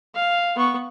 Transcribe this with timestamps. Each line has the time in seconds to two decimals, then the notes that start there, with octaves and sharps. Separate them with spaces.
0.15 F5
0.56 B3 C#6